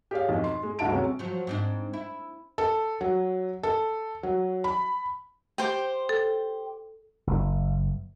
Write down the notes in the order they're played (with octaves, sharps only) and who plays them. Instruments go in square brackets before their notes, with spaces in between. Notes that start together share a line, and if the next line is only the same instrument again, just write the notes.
[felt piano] G4 G#4 C#5 F5
B1 F2
C6
G#3
G1 D2 F#4 E5 A5 D7
C3 F#3 G#3 C#4
[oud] F3 F#3
G#2 C4 D4
E4
[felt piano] A4
F#3
A4
F#3
B5
[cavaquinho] G4 C5 G5
[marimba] A4
[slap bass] F#1